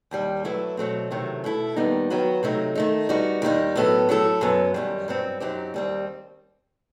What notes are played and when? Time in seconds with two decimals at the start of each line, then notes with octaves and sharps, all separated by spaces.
0.11 D#2 D#3 G3
0.45 F#3 A3 E4 B4
0.77 B2 F#3 A3 C4
1.11 E2 C3 D#3 F#3 A3
1.44 B2 A3 E4 A4
1.76 D#2 D#3 G3 B3 D#4
2.10 D#3 F#3 B3 F#4 B4
2.43 C3 F#3 A3 D#4
2.75 D#3 A3 D#4
3.09 G3 B3 D#4 F#4
3.42 D#2 D#3 G3 D#4
3.76 A2 F#3 B3 E4 A4
4.09 F#3 A3 E4 A4
4.41 F#2 F#3 B3
4.74 F#2 D#3 G3
5.08 G2 F#3 C4
5.40 F#2 F#3 C4 D#4 G4
5.74 D#2 D#3 G3 C4